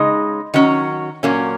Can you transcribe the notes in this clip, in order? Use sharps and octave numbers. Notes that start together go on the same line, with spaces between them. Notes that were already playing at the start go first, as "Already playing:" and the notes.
Already playing: C#3 G#3 D#4
D#3 F#3 C#4
A#2 F#3 A#3 C#4